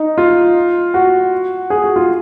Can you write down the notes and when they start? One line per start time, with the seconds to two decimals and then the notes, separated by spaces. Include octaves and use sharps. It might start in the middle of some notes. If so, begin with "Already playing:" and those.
Already playing: D#4
0.18 F4
0.94 F#4
1.70 G#4
1.84 F#4
1.96 F4